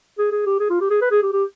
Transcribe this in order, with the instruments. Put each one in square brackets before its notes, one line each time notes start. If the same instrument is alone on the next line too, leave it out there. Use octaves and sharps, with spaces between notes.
[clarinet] G#4
G#4
G4
G#4
F4
G4
G#4
B4
G#4
G4
G4